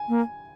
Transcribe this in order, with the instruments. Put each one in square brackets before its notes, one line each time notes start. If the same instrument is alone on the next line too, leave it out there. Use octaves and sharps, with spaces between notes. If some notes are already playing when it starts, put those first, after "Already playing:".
Already playing: [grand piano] G#5
[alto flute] A#3